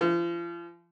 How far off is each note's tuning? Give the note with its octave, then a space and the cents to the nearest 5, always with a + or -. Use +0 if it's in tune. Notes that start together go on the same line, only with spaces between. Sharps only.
F3 -40